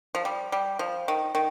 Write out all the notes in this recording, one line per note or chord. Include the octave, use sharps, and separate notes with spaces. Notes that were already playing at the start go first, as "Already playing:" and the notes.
F3
G3
G3
F3
D#3
D#3